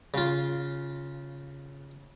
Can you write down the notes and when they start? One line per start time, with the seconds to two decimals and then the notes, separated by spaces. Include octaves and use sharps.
0.14 C#3 F4